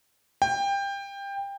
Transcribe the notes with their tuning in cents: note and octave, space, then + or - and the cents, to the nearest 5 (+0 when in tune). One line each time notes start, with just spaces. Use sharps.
G5 +20